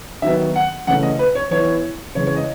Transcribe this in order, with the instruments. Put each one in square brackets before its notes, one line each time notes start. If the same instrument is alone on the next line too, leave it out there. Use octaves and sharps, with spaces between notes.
[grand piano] D#3 F#3 B3 E5
F#5
C#3 E3 A3 C#4 F#5
D#5
B4
C#5
E3 B3 E4 C#5
C#3 E3 G#3 C#5
C#5
D#5